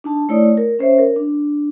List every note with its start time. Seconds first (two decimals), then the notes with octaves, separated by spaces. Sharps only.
0.04 D4 D#4 A5
0.29 A3 E4 C#5 D5 D#6
0.57 A#4
0.79 C#4 C5 C#5 E5
0.98 A#4
1.16 D4